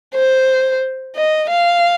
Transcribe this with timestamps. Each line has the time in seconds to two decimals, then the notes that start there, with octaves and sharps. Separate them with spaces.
0.14 C5
1.16 D#5
1.50 F5